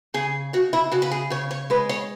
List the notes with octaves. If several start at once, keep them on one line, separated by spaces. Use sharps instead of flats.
C#3 G#4
C#3 F#4
E4
C#3 F#4
B4
G#4
C#3 C#5
C#5
G#3 B4
C#5